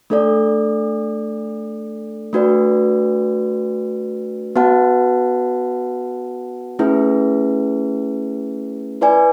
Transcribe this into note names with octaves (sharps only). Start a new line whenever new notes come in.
A3 D4 A4 D5
A3 D4 F#4 B4 D5
B3 F#4 B4 F#5 A5
A3 C#4 E4 G#4 B4
E4 B4 D5 G#5